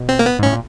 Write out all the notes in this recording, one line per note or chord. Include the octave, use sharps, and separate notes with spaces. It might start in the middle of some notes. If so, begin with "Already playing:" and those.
Already playing: B2
C4
A#3
B3
G#2
A2 C#4
A#2